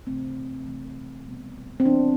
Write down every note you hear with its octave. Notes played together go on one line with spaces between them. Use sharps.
C3 E3 A3 C4
C3 E3 A3 C4
B2 G3 B3
C4
E3 B3 D4